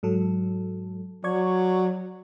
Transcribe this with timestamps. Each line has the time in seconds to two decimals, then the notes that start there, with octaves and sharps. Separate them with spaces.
0.03 G#2 F#3 A4
1.24 F#3 D5 C#6 G#6